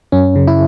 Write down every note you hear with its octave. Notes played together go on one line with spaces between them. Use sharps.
F#2 C#4
C#3
E4